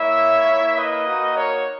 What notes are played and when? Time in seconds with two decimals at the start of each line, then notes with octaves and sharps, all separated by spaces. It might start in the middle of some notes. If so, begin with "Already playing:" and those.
Already playing: A#3 E4 C#5 E5
0.47 A#3 E4
0.76 B4 D#5
1.06 A#3 D#4 F#4
1.35 A#4 C#5